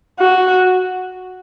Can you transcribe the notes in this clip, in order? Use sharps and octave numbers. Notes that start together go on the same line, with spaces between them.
F#4